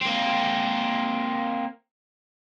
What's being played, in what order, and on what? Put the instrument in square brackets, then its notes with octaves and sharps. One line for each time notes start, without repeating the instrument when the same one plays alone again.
[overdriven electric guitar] A#3 C4